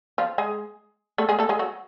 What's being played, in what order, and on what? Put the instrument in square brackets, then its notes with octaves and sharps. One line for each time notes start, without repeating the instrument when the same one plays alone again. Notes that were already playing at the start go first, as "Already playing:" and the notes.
[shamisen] F3 F4
G#3 G#4
A3 A4
G#3 G#4
A3 A4
G#3 G#4
F#3 F#4